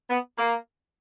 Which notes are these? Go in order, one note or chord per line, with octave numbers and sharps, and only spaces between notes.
B3
A#3